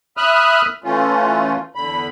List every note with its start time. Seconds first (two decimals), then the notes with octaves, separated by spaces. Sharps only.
0.17 E5 B5 D#6 F6 F#6
0.84 E3 A3 C#4 F4
1.75 E2 D3 B5